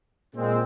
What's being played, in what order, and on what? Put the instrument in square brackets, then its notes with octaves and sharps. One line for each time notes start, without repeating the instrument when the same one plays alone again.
[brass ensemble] A#2 G#3 C4